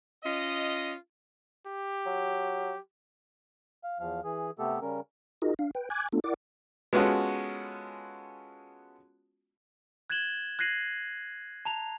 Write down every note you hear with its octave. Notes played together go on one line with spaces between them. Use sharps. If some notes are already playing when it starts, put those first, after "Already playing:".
C#4 F4 D#5
G4
F#3
F5
E2 F3 F5
E3 G#4
C3 A3 B3 G4 A4
C#3 G3 C#4 A#4
D#4 F4 F#4 G#4 A#4 D#5
D4 F5
B4 G5
G#5 D6 F#6 G#6
A3 B3 D4 F4 A4
E4 A#4 D5 F#5 D6
G#3 B3 C#4 F4 F#4 A4
F#6 G#6 A6 E7 F#7 G7
F#6 G#6 A#6 C7 D#7 F#7
A5 A#5 F7